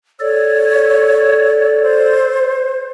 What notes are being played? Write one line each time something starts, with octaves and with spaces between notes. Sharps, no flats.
A4 C#5 D5
C5